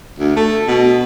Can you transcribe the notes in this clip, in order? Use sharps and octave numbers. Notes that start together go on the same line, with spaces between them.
D2
A3
B2